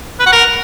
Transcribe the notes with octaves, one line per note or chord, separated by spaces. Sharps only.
B4
F#5
A#4